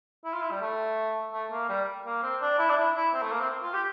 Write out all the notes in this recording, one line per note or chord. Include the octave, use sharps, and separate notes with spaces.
E4
F4
E4
G3
A3
A3
A#3
G3
A#3
C4
D4
E4
D4
E4
E4
C4
A3
A#3
C4
F4
G4